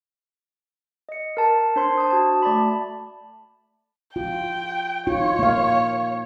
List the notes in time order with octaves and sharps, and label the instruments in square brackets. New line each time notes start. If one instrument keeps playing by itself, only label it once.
[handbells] D#5 C#7
A#4 A5
D4 C5 C6
A5 D#6
F#4 A5
A3 D5 A5 B5
[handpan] F4 [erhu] G5
[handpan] D#4 F4 [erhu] C#5
[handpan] A#3 F5